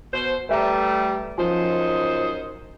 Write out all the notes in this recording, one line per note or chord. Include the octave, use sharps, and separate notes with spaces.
B2 C5
G3 A3 B4 E5 A#5
F#2 F3 D#4 C5